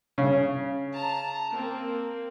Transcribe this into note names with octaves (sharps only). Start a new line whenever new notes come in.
C#3
A5 A#5
A#3 C4